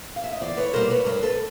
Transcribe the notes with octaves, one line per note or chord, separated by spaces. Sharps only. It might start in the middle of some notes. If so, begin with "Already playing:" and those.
F5
E5
D#5
E2 C5 D5
B4 C#5
B2 G3 A#3 A#4 C5
B4 C#5
G2 A#4 C5
A4 B4